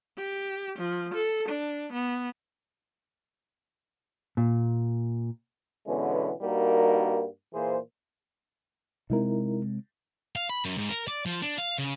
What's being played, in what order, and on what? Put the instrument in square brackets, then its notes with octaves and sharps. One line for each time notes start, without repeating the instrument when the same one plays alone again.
[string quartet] G4
F3
A4
D4
B3
[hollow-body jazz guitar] A#2
[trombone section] B2 D3 E3 G#3 B3 C#4
G2 G3 A#3 D#4 F#4 A#4
A#2 E3 A#3 G#4 C5
[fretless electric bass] C3 G#3 C4 [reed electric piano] D#4 E4 A#4
[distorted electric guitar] F5
B5
F#2
G#2
A#4
D5
F3
D4
F5
C#3